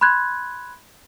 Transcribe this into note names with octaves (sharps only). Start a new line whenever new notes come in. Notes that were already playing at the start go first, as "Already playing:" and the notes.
B5 C6 F#6 G#6